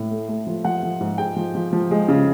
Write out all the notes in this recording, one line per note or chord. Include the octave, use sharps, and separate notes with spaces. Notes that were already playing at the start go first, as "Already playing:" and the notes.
Already playing: A2
A3
A3
F3
F3 F#5
F3
G#2
G#3 G5
F3
F3
F3
G#3
C#3